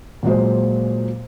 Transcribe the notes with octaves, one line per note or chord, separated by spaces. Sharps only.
A#2 F#3 G#3 C5